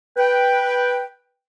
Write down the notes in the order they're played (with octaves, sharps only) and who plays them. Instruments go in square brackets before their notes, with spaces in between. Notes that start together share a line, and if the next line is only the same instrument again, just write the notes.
[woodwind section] B4 G5